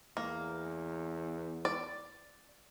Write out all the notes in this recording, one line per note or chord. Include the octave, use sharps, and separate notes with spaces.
E2 A#3
D5